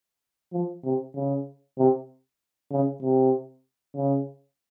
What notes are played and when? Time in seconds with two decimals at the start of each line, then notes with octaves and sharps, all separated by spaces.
0.53 F3
0.84 C3
1.16 C#3
1.78 C3
2.72 C#3
3.03 C3
3.96 C#3